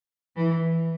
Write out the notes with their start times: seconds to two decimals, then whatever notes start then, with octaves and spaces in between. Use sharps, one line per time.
0.36 E3